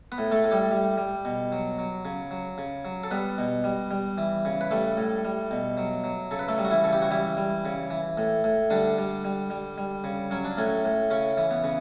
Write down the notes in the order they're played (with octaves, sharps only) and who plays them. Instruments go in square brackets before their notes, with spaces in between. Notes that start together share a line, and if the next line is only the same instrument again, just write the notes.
[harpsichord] B3 B4
A2
A3 A4
A2
G3 G4
G3
G3
B2
F#3
F#3
C#3
F#3
C#3
F#3
A4
G3 B3 B4
B2
G3
G3
E3
C#3
B4
G3 A3 A4
A2
G3
B2
F#3
F#3
C#3 A4
B4
A3 A4
G3
F#4
E3 E4
C#3 A4
G4
F#4
E3 G3 E4
G3
C#3
E3
A2
A2
D3 G3 D4
G3
G3
G3
G3
C#3
F#3 C#4
D4
A2 C#4
A2
C#3 C#4
E3
B3
C#3